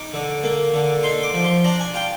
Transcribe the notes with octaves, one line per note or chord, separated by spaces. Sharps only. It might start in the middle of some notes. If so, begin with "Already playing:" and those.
Already playing: D#4 D6
D3
A#3
D3
D#4 C6
D6
F3
C6
D4 A#5
G#5
F4 G5